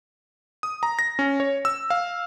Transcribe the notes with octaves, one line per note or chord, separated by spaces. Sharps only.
D#6
A#5
A#6
C#4
C#5
E6
F5